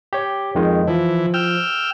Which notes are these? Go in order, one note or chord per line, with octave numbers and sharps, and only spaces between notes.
G4 C#5
F2 D#3 G#3
E3 F3
G5 E6 F6